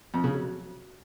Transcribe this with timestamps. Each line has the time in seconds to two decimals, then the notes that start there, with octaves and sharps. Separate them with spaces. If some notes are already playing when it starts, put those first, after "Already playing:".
0.14 F2
0.24 C#3
0.34 F#3